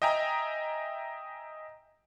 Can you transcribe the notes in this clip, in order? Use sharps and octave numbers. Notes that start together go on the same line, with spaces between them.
D#5 E5 G5 G#5 A#5